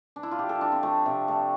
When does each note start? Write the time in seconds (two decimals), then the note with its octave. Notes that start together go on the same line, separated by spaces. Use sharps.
0.16 D4
0.23 E4
0.31 F4
0.39 F3 G4
0.49 A4
0.56 E4
0.61 F3 D4
0.72 C4
0.83 F3 A3
1.06 C3
1.28 A3